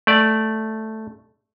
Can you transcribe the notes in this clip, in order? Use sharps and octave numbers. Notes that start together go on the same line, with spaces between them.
A3 D5